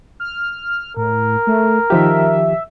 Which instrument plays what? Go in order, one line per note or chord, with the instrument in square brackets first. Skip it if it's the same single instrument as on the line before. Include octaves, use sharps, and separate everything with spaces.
[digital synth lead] F6
[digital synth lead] A2 [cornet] A#4
[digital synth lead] A3
[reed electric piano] D#3 F3 G4 [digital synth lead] E5